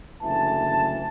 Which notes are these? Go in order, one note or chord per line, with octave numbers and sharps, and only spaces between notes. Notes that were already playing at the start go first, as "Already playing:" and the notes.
F#1 D2 E3 A5